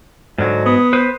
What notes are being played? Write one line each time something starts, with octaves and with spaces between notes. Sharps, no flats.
G#2 D3 F#3
B3 D#6
B4 C5